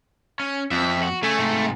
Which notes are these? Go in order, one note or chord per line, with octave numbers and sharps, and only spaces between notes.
C#4
F2 E5
F#4
C#3 A3 G#5
G#2 C3